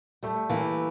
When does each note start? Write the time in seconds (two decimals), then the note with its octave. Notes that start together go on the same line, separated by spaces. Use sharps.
0.23 G3 A3
0.49 E3 A#3